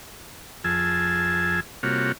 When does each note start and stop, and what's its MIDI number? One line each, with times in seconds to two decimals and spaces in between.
0.64 1.60 41
0.64 1.60 53
0.64 1.60 68
0.64 1.60 80
0.64 1.60 81
0.64 1.60 88
1.83 2.12 48
1.83 2.12 55
1.83 2.12 58
1.83 2.12 65
1.83 2.12 66
1.83 2.12 73